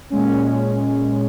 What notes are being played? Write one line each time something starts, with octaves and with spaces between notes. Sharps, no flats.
A#2 G#3 C#4